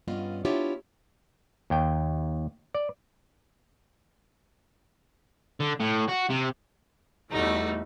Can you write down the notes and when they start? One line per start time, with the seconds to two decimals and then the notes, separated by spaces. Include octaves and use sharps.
0.08 G2 B3 C#4 F4 D5 D#5
0.45 B3 D4 E4 F4 G4 C#5
1.70 D#2 G5
2.75 D5
5.60 D3
5.80 A2
6.08 F#4
6.30 C3
7.31 E2 G3 A3 D#4 F#4